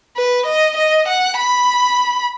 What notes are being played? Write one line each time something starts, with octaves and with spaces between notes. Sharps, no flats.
B4
D#5
D#5
F#5
B5